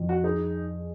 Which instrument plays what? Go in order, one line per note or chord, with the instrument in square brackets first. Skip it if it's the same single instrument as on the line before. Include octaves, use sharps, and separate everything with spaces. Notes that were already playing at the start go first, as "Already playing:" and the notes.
Already playing: [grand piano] F2 C4
[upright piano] F#4
[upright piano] D#4 [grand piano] G#4